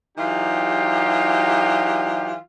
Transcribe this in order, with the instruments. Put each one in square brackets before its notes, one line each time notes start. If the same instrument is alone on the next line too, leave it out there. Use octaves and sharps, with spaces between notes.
[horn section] E3 F#3 D#4 F4 G4